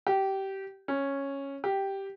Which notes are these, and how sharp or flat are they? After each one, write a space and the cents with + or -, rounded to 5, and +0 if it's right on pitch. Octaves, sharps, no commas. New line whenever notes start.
G4 -20
C#4 -5
G4 -5